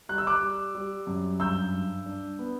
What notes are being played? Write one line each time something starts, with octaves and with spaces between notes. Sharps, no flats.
G3 F#6
E6
D6 F#6
G3
G3
F#2
G2 E6 G6
G2
D4
B3